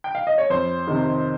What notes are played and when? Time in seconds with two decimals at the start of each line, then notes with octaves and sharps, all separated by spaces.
0.04 G5
0.15 F5
0.27 D#5
0.38 C#5
0.50 F2 C5
0.87 C3 D#3